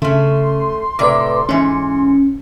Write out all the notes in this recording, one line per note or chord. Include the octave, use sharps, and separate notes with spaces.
C#3 A3 C#4 C6
A2 C3 A3 B4 D5 D6
G#2 E3 C#4